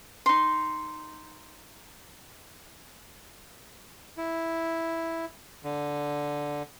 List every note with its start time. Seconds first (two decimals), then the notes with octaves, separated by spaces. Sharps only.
0.26 D#4 C6
4.17 E4
5.64 D3